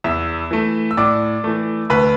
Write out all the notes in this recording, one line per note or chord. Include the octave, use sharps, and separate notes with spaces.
E2 E5 E6
E3 A3
E6
A2 D5 D6
E3 A3
D2 B4 B5